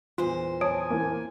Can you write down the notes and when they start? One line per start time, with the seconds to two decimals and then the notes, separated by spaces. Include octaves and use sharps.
0.18 E2 A#2 F4 C5
0.61 C#5 G#5 A5 D#6 D7
0.90 E3 A#3